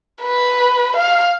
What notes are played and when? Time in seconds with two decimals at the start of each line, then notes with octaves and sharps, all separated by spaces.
0.23 B4
0.97 F5